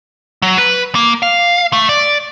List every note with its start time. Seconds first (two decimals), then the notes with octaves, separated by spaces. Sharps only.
0.42 F#3
0.58 B4
0.95 A#3
1.22 F5
1.73 A3
1.89 D5